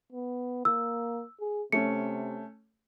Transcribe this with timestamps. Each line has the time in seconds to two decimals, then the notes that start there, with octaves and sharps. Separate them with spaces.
0.12 B3
0.65 A#3 E6
1.40 G#4
1.72 C3 A3 C#4 C#7